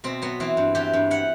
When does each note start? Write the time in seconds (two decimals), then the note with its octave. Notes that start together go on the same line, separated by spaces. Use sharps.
0.04 B2 C4
0.22 F#3 B3
0.40 E3 C4
0.57 G2
0.75 E3 G4
0.93 G2
1.11 E3 F#5